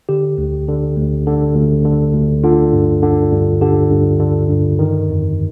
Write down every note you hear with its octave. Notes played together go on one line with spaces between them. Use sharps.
D3 G4
D2
D3
D2
D3
D2
D3
D2
D3 F4
G2
D3
G2
D3 G4
G2
D3
G2
D#3
F2